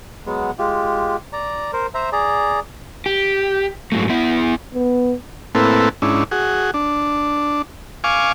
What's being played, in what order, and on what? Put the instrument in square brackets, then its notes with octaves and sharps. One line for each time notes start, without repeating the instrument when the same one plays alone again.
[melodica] F#3 G#3 B3
G#3 F4 G4
D5 A#5
A#4 C5
C5 E5 A#5
G#4 D5 A#5
[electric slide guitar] G4
G#2 F#3 A3
B3 E4 E5
[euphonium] B3
[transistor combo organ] A2 A#3 C4 E4 A4 B4
G#2 C#4 D4 E4
F#4 G#4
D4
F5 G#5 C#6 D6